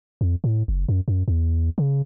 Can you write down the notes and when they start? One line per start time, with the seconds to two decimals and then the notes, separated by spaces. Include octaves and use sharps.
0.21 F2
0.44 A2
0.68 F#1
0.89 F#2
1.08 F#2
1.28 E2
1.78 C#3